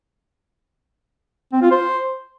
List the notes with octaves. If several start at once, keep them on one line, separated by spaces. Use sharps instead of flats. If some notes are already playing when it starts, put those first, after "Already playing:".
C4
F4
C5